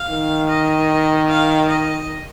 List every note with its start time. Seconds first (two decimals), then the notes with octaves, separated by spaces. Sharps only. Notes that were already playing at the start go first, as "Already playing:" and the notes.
Already playing: F5
0.10 D#3
0.49 D#5
1.28 F5
1.69 D#5